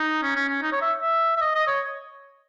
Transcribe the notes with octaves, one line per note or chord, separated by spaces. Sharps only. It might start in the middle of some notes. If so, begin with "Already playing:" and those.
Already playing: D#4
C#4
C#4
C#4
D#4
C#5
E5
E5
E5
D#5
D#5
C#5